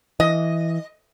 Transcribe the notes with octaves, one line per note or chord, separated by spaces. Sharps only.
E3 D#5